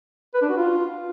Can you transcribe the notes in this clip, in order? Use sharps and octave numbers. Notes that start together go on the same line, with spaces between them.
B4
D4
F#4
F4